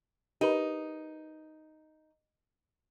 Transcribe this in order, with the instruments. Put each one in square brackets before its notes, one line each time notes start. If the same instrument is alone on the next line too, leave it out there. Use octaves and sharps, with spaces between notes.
[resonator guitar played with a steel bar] D#4 [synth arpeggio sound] G4 A#4 B4